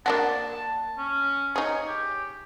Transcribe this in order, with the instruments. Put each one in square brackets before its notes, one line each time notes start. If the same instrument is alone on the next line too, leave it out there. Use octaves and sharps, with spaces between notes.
[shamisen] A#3 D4 F#4 [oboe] A5
[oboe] C#4
[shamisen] D#4 G#4 [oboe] C#5
[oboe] G4